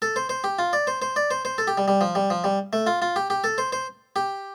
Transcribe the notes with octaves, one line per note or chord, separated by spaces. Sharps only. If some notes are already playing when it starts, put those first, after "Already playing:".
A4
C5
C5
G4
F4
D5
C5
C5
D5
C5
C5
A4
G4
G3
G3
F3
G3
F3
G3
A3
F4
F4
G4
G4
A4
C5
C5
G4